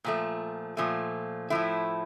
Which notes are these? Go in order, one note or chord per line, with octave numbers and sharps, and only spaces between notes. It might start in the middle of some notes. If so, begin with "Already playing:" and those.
A#2 F3 A3
A#2 F3 A3
A2 F3 A3 E4